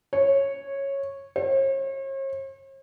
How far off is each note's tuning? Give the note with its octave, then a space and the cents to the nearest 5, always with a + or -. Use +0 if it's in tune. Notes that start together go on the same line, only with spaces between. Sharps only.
C#5 -10
C#5 -45